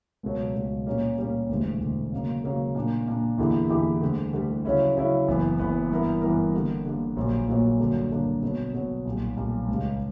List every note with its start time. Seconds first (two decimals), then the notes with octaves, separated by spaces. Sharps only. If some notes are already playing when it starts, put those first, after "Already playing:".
0.23 C#2 B2 F#3
0.55 C#2 B2 F#3
0.86 A#2 G3 A#3 C#4
1.18 A#2 G3 A#3 C#4
1.49 E1 D2 D3
1.80 E1 D2 D3
2.12 C#3 F#3 A#3
2.44 C#3 F#3 A#3
2.75 A#2 A#3 D4
3.07 A#2 A#3 D4
3.38 E2 D3 A#3 E4 G4
3.70 E2 D3 A#3 E4 G4
4.01 D2 D3 G3
4.33 D2 D3 G3
4.65 C#3 F#3 C#4 E4
4.96 C#3 F#3 C#4 E4
5.28 F#1 F#2 E3 B3
5.58 F#1 F#2 E3 B3
5.91 G2 E3 B3 E4 A#4
6.22 G2 E3 B3 E4 A#4
6.53 D3 G3 A#3
6.85 D3 G3 A#3
7.16 A#1 A#2 F#3 A#3
7.48 A#1 A#2 F#3 A#3
7.80 G2 D3 F#3 A#3 D4
8.11 G2 D3 F#3 A#3 D4
8.42 B2 F#3 B3
8.74 B2 F#3 B3
9.05 B1 A#2 G3
9.37 B1 A#2 G3
9.68 C#2 C#3 G3